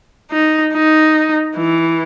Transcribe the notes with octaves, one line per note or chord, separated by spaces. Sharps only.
D#4
D#4
E3